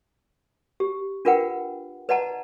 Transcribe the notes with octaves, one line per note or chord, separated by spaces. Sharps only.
G4
D4 F4 A#4 B4 F#5 G5
B4 D5 D#5 F#5 A5 A#5